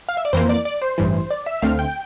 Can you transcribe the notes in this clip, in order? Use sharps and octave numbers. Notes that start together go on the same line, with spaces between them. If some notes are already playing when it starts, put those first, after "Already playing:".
F5
E5
D5
F2 E3 A#3 C5
D5
D5
C5
A1 G2 E3
D5
E5
D2 D3 A3 C4 F5
G5